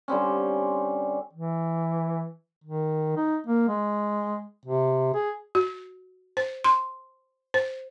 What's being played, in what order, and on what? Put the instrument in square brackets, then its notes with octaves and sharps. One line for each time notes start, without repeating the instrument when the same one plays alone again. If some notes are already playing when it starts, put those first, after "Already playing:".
[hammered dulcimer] D3 G3 C4 C#4
[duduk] E3
D#3
D#4
A#3
G#3
C3
G#4
[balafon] F#4
C5
C6
C5